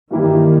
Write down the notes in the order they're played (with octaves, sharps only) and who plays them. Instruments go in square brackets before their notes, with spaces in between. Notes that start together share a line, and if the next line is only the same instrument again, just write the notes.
[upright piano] G2 E3 A#3 E4 G4 [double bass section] D#3